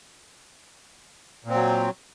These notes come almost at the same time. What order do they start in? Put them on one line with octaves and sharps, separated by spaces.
A#2 C4 F#3